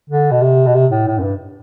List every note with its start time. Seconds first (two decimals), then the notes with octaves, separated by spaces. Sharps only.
0.10 D3
0.31 B2
0.42 C3
0.67 B2
0.75 C3
0.91 A2
1.07 A2
1.18 F#2
1.23 G2